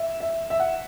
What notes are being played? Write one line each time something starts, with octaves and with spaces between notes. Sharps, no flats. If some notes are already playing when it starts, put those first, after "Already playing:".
Already playing: E5
E5
E5
F#5